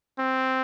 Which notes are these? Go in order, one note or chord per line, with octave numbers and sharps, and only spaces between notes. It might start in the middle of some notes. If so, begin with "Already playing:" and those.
C4